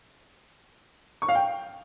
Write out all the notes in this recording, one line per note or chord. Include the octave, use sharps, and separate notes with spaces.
C#6
F5
G5